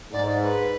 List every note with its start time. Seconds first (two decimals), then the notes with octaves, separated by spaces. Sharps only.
0.12 G#2 D5
0.28 D5
0.42 B4